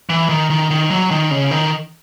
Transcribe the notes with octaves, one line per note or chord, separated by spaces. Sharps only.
E3
D#3
D#3
D#3
F#3
D#3
C#3
D#3